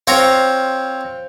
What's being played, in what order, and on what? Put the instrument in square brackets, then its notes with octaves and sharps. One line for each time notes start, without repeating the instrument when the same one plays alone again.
[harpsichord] C4 C#5 A#5 [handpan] C5 F5